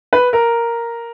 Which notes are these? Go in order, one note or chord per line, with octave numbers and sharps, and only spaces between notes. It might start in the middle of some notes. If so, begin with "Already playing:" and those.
B4
A#4